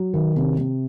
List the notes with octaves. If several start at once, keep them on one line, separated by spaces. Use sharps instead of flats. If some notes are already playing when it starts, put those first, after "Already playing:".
Already playing: F#3
D#3
C3
C3